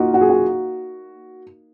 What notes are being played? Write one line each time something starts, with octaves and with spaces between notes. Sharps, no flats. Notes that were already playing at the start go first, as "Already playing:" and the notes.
Already playing: A#3 D#4 F4 F#4
F#4
G#4
F#4